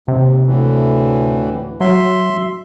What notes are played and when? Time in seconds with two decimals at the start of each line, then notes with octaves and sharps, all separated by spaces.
0.08 D#2 C3
0.46 D2 A2 E3
1.80 F#3 E5 C6